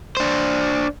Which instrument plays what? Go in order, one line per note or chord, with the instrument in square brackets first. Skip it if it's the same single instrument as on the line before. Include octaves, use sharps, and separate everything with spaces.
[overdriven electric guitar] D4 C5